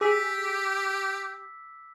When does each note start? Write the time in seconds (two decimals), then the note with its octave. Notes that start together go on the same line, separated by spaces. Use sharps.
0.01 G4 G#4 D6 E6 B6